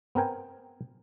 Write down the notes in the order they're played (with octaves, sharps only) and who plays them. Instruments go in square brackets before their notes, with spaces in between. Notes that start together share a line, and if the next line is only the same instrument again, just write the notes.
[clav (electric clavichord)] B3 C4 A#4 G5 G#5